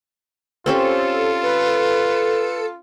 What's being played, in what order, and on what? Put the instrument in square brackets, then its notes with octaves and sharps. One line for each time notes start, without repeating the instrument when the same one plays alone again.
[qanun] C4 C#4 G4 [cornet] F4 [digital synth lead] A4
[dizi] B4